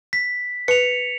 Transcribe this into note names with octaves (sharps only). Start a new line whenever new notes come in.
B6
B4 C#7 F7